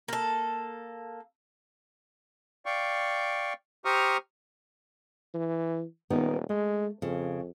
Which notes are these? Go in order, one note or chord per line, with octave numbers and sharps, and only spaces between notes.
A#3 A4
D5 F5 G5 C#6
G4 C5 A#5 C#6 D#6 F6
E3
D#1 D#3 B3 D#4
G#3 A3
F2 C#3